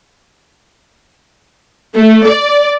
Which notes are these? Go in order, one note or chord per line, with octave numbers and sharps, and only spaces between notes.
A3
D5